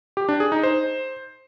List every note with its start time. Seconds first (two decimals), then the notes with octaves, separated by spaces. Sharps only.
0.17 G4
0.29 D4
0.40 G#4
0.52 D#4
0.63 C5